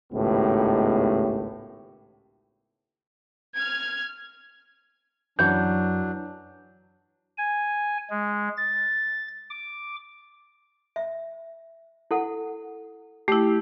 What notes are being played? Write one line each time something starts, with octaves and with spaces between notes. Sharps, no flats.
G#1 C#2 A2 D#3 B3 G4
F6 G#6
F#2 E3 F#3 D4 F#4 G6
G#5
G#3
A6
D6
E5
E4 A4 F#5
A3 E4 G4